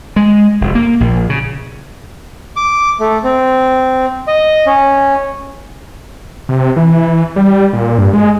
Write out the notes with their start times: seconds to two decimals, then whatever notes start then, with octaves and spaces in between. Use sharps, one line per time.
0.16 G#3
0.61 F1
0.75 A#3
1.00 A#1
1.29 C#3
2.56 D6
3.00 A3
3.24 C4
4.28 D#5
4.67 C#4
6.49 C3
6.76 E3
7.36 G3
7.73 A#2
7.98 G2
8.13 G#3